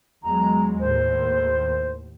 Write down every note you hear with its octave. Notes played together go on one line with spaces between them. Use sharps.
E2 F#3 G#3 A#5
D#2 A2 C5